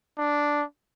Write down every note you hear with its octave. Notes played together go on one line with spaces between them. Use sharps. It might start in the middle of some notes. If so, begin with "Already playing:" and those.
D4